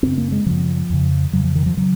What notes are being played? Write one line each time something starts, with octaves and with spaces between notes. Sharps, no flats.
F#2 C#3 C4
A#3
G#3
F#2 C#3 F3
F2 C#3
F2 C#3 F#3
F3
D#3
F3
C#3 F#3